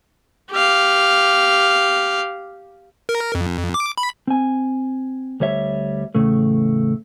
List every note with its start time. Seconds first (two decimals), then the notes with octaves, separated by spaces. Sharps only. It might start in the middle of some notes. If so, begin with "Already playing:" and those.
0.51 G4 F5
3.09 A#4
3.35 F2
3.74 D6
3.98 B5
4.27 C4 G#5
5.40 D2 G3 C#5 E5
6.15 E2 A2 C#3 A3